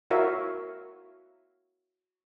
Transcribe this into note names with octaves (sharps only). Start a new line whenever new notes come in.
E4 F#4 A#4 C#5 E5 F5